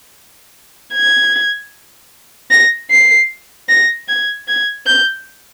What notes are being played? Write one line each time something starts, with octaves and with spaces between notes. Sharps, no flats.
G#6
A#6
C7
A#6
G#6
G#6
G6